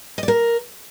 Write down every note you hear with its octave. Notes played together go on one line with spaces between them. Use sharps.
D#5
D5
A#4